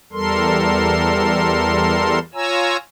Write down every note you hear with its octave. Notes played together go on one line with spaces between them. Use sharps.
E2 G3 A4 A#4 C6
F4 C#5 G#5 A#5 E6